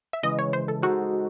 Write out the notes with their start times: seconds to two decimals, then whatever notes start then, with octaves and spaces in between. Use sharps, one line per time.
0.13 E5
0.23 C#3 E3 G#3 D#5
0.39 C#5
0.53 C5
0.68 A4
0.82 G#3 D#4 F#4 A4 C5